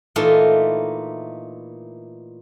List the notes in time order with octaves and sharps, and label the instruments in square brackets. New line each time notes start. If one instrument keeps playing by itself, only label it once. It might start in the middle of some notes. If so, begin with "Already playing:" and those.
[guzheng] A#2 E3 A3 D#4 F4